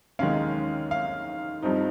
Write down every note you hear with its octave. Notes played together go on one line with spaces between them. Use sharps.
D#2 D#3 G#3 C#4 F5
F5
G2 F3 C4 D#4